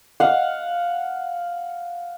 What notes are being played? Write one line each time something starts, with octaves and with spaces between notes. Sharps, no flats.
F5 F#5